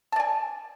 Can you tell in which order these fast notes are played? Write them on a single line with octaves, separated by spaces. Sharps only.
A5 D5 G#5